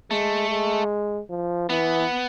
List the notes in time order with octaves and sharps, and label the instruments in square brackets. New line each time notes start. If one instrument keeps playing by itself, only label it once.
[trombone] G#3 [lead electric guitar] A3
[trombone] G#3
F3
[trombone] E3 [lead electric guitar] B3